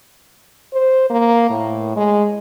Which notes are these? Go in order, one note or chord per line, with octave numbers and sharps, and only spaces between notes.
C5
A#3
A2
G#3